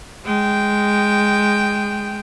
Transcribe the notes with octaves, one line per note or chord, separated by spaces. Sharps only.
G#3 G5